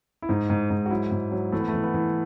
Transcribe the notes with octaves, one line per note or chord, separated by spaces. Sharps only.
E4
G#2 D#4
G#2
G#2
F#4
F#3 E4
G#2
F#3
E3 A3
B3
A3
E3
B3
E3